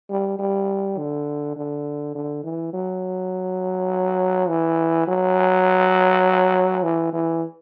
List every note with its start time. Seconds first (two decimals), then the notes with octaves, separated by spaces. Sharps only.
0.10 G3
0.39 G3
0.98 D3
1.56 D3
2.15 D3
2.44 E3
2.73 F#3
4.48 E3
5.08 F#3
6.83 E3
7.13 E3